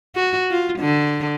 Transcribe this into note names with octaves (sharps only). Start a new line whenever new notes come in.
F#4
F4
D3